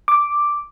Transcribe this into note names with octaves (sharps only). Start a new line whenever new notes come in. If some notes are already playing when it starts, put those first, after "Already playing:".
D6